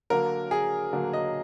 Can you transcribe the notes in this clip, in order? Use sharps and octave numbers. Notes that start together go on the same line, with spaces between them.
D3 F#3 A#3 A#4
G#4
D3 F#3 A#3
D#5